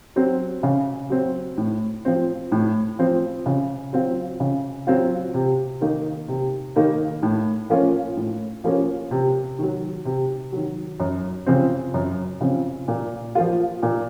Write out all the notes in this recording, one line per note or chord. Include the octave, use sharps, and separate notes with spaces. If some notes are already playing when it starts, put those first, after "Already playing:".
F#3 C4
C#3
F#3 C4
A2
F3 C4
A2
F3 C4
C#3
F#3 C4 F4
C#3
F#3 C4 F4
C3
D#3 A#3 D#4
C3
D#3 A#3 D#4
A2
F3 A#3 C#4 F4
A2
F3 A#3 C#4 F4
C3
D#3 F#3
C3
D#3 F#3
F#2
C#3 F3 C4
F#2
C#3 F3 C4
A#2
F3 A#3 F4
A#2